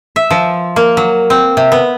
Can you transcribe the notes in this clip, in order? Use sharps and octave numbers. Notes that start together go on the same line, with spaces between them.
E5
F3
A#3
F#3
C4
C3
B3